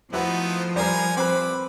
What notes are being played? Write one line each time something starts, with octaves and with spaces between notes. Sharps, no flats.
F3 A3 B3 D#4 E4 F#4 B4
G3 A#4 G#5 A#5
C4 B4 B5 D6